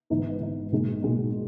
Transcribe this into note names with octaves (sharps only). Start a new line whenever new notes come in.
G#1 G#2 E3 B3 D#4
G#1 G#2 E3 B3 D#4
B1 A#2 G#3 D#4
B1 A#2 G#3 D#4